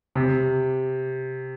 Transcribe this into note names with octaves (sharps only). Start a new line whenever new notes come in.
C3